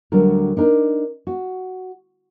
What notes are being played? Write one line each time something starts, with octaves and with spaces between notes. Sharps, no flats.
D2 D3 F#3 G3 A#4
D4 D#4 A#4
F#4